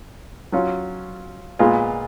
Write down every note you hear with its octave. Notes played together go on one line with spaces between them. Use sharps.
F#3 C#4 F4
A#2 G#3 B3 F4